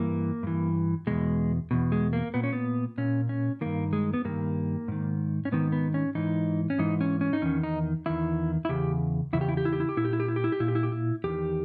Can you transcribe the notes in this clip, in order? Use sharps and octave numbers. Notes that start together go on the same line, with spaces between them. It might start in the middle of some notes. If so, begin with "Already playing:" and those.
Already playing: G2 E3 A#3
G2 E3
E2 B2 G#3
E2 B2
G#3
A#3
A#2 B3
C#4
B3
A#2 C#4
C#4
G2 D#3 A#3
G#3
B3
G2 D#3 A#3
G#2 D#3
C#4
G#2 D#3 B3
B3
C#4
G#2 E3 D#4
C#4
G#2 E3 D#4
C#4
C#4
D#4
E2 D#3 C#4
D#4
E2 D#3 E4
E4
E2 C#3 G4
E2 C#3 E4
G4
E4
G4
E4
G4
E4
G4
A#2 E4
G4
E4
G4
E4
G4
E4
G4
A#2 E4
G4
E4
G4
E4
E2 D#3 G4